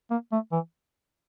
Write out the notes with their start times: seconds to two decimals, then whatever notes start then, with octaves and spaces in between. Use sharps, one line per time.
0.10 A#3
0.32 A3
0.52 E3